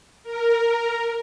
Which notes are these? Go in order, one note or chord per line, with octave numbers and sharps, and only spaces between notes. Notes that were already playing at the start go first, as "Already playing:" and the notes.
A#4